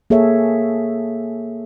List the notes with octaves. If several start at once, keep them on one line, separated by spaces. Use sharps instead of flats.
A#3 G#4 A4 C#5 E5